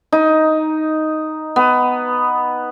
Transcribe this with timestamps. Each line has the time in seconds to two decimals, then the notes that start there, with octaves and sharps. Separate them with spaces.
0.12 D#4
1.56 B3